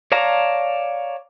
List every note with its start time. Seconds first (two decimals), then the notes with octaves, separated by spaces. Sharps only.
0.12 C#5 D5 F5 A5 A#5